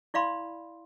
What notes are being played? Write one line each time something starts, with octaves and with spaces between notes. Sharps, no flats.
E4 D5 F5 B5 C6